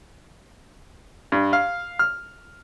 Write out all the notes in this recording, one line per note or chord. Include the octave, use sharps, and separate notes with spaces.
G2
F5
F6